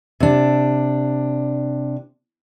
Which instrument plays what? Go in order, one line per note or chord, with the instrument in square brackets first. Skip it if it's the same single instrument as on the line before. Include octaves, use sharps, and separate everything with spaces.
[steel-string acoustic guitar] C3 D4